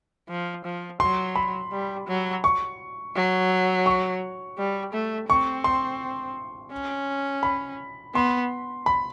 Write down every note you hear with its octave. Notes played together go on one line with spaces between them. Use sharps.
F3
F3
F#3 C6
B5
G3
F#3
C#6
F#3
C#6
G3
A3
C4 C#6
C6
C#4
B5
B3 C6
B5